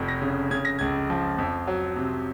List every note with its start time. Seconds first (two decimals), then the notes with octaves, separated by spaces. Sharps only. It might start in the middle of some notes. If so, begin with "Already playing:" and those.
Already playing: F1 F2
0.08 A#6
0.22 C#3
0.51 C#3 G#6
0.65 A#6
0.79 C#2 G#6
1.10 F3
1.38 F2
1.67 F#3
1.96 C3